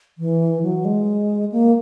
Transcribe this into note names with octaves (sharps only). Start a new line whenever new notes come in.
E3
F#3
G#3
A#3